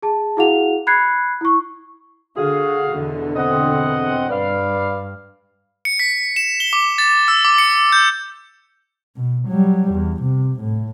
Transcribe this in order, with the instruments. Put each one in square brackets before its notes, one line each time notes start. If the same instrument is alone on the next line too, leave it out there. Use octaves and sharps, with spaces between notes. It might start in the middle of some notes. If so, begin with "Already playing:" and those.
[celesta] G#4 A5
E4 F#4 G#4 F5 F#5 F7
B5 F#6 G#6 C7 C#7
E4 C#6
[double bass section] D3 [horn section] F#4 G#4 F5
[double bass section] E2 B2 D3
[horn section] C4 D#5 F#5
[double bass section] G2 [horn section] B4 D5 F5
[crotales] C#7
B6
E7
G7
D6
A6
E6
D6
C#7
G6
[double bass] B2
F#3 G3
E2
C3
A2